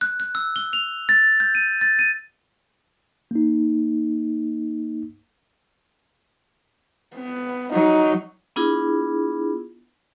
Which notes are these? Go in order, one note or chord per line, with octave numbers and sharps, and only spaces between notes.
F#6
F#6
E6
G7
F7
A6
G6
D#7
A6
D#7
A#3 D#4
B3
F#3 D#4
B3 D4 E4 F4 G#4